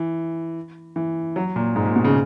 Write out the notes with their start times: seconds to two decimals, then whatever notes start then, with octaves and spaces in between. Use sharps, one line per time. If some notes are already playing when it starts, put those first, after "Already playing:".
Already playing: E3
0.96 E3
1.36 F#3
1.56 A#2
1.76 G#2
1.86 A#2
1.96 B2
2.05 C#3